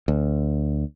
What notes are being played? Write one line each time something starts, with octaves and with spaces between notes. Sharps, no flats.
D2